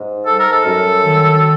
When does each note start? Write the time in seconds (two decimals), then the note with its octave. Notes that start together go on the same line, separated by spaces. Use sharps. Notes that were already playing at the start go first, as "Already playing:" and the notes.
Already playing: G#2
0.26 G3 A4
0.39 A#4
0.52 A4
0.64 F#2
1.03 D#3